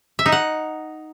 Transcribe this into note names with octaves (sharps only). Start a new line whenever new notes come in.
E5
D#4
F#5